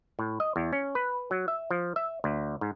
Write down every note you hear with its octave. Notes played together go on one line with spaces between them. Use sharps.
A2
D#5
E2
C#4
B4
F#3
E5
F3
E5
D2
G#2